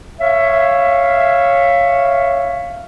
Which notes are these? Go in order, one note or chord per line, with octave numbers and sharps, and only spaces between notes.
C#5 E5 F5